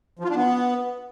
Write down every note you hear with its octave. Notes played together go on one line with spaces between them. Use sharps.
F3
F4
D4
B3